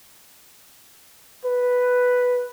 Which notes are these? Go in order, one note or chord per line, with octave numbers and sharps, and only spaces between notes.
B4